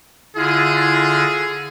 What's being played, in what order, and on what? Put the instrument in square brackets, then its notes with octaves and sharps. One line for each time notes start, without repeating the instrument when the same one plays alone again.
[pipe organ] D3 [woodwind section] E4 F4 [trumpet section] G#4